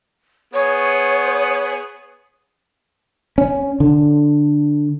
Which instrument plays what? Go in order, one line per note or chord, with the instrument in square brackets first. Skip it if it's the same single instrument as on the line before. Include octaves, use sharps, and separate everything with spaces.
[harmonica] B3 G#4 [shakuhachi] C#5
[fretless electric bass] C#4
D3